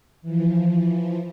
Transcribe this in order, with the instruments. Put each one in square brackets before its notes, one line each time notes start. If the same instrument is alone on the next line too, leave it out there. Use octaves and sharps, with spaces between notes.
[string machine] E3 F3